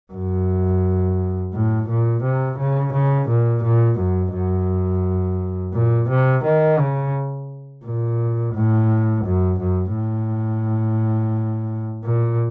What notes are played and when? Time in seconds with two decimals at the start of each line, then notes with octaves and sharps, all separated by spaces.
0.13 F#2
1.53 A2
1.89 A#2
2.23 C3
2.58 C#3
2.93 C#3
3.29 A#2
3.63 A#2
3.99 F#2
4.34 F#2
5.74 A#2
6.09 C3
6.44 D#3
6.79 C#3
7.85 A#2
8.54 A2
9.25 F#2
9.59 F#2
9.95 A2
12.05 A#2